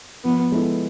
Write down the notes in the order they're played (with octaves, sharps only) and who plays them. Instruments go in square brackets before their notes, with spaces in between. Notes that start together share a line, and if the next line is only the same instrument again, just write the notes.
[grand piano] F3 [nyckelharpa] B3
[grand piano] G#3 B3 E4 A4